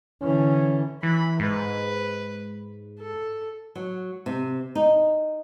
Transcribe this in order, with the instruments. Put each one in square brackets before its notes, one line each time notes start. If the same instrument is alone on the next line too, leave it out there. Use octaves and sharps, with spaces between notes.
[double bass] D3 E3 [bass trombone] C#4
[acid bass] E3 [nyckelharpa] B5
[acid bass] G#2 [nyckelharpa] B4
[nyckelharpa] A4
[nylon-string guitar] F#3
C3
D#4